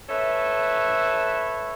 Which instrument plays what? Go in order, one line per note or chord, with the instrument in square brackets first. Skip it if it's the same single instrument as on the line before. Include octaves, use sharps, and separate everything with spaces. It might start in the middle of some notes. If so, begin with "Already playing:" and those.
[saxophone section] A4 B4 C#5 E5